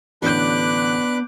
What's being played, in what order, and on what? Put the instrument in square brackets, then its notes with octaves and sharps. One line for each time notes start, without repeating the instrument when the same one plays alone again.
[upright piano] A1 D3 G6 [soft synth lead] B3 [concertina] D4 B4 [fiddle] D6 F#6